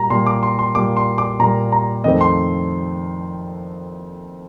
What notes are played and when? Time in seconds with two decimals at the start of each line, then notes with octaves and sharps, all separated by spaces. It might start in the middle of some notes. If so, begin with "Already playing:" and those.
Already playing: A#2 G3 A#3 A#5
0.10 A#2 G3 A#3 C6
0.26 D6
0.43 C6
0.59 C6
0.75 A#2 G3 A#3 D6
0.97 C6
1.18 D6
1.39 A#2 G3 A#3 A#5
1.72 A#5
2.04 F2 D#3 A3 C4 D#5
2.21 C6